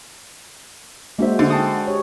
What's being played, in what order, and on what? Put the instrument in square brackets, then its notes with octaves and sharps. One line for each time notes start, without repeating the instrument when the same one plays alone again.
[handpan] G#3 F#4 C5 [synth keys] A#3 D4 E5
[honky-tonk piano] D3
[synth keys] G5 A5 D#6
[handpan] G4 C#5